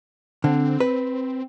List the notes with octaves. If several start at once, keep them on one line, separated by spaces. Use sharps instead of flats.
D3 C4
B4